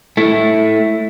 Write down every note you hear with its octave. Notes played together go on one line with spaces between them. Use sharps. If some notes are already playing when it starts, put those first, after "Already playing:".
A3 E4